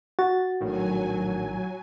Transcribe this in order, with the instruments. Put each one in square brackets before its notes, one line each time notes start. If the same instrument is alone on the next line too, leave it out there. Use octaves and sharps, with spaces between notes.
[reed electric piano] F#4 [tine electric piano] A6
[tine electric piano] A#1 A2 D#3 [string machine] F#3 G#5